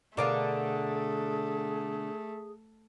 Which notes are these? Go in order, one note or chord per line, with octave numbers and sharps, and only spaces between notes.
B2 D3 A3 G#4 A#4 D5 F5 D6